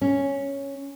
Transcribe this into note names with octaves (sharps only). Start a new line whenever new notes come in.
C#4